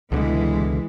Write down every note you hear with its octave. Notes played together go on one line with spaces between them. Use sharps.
C#2 B2 D3 E3 G#3